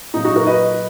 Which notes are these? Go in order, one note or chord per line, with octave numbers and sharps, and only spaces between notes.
A#2 F#3 D#4
D#4 F#4
F#4 A#4
B4 D#5